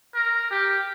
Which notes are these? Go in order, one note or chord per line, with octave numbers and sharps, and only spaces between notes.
A#4
G4